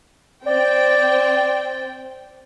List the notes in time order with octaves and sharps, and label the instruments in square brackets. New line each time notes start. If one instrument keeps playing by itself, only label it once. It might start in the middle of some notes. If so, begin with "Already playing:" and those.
[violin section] C4 G5 [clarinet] D5